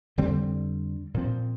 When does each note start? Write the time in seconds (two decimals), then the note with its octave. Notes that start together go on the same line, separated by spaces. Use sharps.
0.18 F2 D3 G3 C4
1.14 A#2 F3 C4